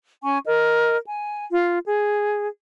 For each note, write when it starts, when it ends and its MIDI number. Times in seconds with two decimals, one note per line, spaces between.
0.23 0.38 61
0.23 0.38 80
0.23 0.38 85
0.45 0.97 70
0.45 0.97 75
1.06 1.44 80
1.50 1.78 65
1.86 2.48 68